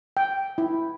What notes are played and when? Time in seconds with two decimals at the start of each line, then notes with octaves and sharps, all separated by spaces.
0.17 G5
0.58 E4